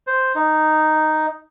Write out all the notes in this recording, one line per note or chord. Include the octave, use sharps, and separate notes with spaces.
C5
D#4